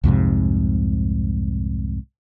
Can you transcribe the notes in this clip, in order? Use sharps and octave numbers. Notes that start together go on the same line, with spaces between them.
C2 F2 G#2 C3